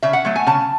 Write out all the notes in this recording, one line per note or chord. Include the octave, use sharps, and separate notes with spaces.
C#3 E5
F#5
F#3 A3
G#5
C#3 A5